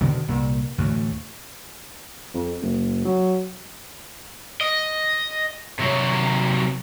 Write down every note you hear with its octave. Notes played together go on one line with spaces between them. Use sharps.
B2 D3 D#3
C2 A#2
D2 A2 E3 A3
F2
F#1
F#3
D#5
C3 F#3